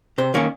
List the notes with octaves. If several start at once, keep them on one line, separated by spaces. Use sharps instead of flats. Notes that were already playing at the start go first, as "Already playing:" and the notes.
C3 C5
D#3 A#3 C#4 C#5